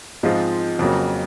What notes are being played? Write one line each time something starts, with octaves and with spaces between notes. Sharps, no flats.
G#2 F3 G#3 C4 F4
F2 C#3 F#3 A#3